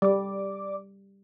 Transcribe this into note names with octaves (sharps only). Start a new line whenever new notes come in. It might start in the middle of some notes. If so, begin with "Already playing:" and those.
G3 D5 D6